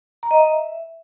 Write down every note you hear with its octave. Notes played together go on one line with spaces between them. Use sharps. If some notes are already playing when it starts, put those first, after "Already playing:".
A#5
D#5
E5